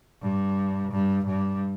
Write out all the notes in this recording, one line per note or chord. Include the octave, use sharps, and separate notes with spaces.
G2
G2
G2